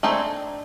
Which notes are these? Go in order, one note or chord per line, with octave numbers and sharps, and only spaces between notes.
A3 C4 D4 D#4 G#4